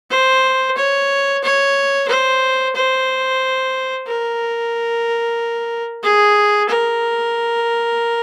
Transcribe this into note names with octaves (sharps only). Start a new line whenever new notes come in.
C5
C#5
C#5
C5
C5
A#4
G#4
A#4